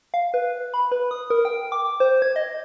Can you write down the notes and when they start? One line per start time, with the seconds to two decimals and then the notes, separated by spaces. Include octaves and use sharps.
0.14 F5
0.34 B4
0.74 B5
0.92 B4
1.11 D#6
1.30 A#4
1.45 G5
1.72 D6
2.00 C5
2.22 G#6
2.36 D#5